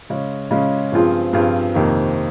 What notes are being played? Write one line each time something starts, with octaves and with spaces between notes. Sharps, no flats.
C#3 G#3 C#4
C#3 G#3 C#4
G2 F3 C4 F4 G#4
G2 F3 C4 F4 G#4
F2 C3 D#3 A#3